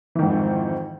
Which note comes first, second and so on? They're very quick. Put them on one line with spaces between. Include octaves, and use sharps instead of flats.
E3 D#3 G#2 F2